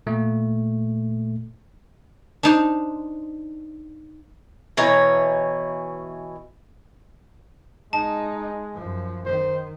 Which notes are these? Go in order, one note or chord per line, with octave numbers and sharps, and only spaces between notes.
A#2 A3
D4 D#4 C5
B2 E3 C#5 A#5
G#3 D#4 A5
F#2 F3
D#3 C5